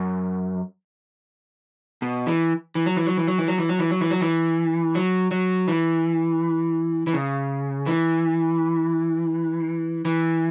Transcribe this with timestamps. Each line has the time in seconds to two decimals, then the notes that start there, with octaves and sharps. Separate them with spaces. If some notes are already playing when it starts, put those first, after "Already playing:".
Already playing: F#2
2.02 B2
2.27 E3
2.75 E3
2.86 F#3
2.97 E3
3.07 F#3
3.17 E3
3.28 F#3
3.39 E3
3.48 F#3
3.58 E3
3.69 F#3
3.79 E3
3.91 F#3
4.01 E3
4.11 F#3
4.21 E3
4.95 F#3
5.31 F#3
5.68 E3
7.07 E3
7.14 C#3
7.86 E3
10.05 E3